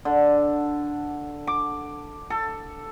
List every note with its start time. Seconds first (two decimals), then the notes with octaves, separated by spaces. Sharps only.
0.05 D3
1.47 D6
2.30 A4